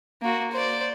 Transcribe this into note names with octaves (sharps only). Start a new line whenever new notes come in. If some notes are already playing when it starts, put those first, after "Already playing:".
A#3 F#4
C5 D5